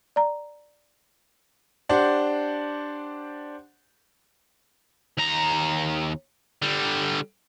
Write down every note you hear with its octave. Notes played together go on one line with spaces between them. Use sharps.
D5 A#5
D4 G4 C5 D5 F#5
D#2 A#5
D3 G3